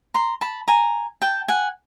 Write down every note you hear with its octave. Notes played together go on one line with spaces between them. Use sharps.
A#5 C6
A5 B5
G#5 A#5
G5 A5
F#5 G#5